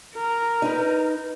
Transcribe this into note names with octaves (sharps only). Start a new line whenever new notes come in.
A#4
D#4 B4